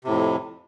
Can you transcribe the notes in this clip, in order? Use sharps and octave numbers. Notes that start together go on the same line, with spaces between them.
F2 A2 C3